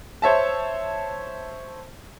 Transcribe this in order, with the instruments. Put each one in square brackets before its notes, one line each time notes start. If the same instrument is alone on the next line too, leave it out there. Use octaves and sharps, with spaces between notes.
[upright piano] C5 C#5 E5 A5